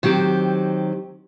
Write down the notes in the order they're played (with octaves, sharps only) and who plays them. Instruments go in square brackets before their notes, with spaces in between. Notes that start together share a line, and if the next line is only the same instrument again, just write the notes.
[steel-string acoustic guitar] D#3 F#3 C4 G4